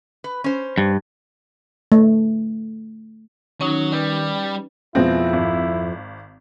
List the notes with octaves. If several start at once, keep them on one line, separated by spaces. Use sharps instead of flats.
B4
C#4 C5
G2
A3
D#3 F#3 C#4 D#4
G3 B4
F2 B2 G#3 C4 E4 F4
G#1